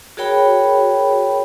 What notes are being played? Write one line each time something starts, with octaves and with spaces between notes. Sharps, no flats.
F#4 G#4 A#4 C#5 G5 B5